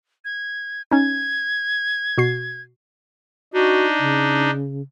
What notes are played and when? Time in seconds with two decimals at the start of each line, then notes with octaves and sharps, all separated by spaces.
0.25 G#6
0.91 C#4 D#4 G#6
2.18 B2 F#4 C7
3.53 D4 D#4 F#4
3.99 C#3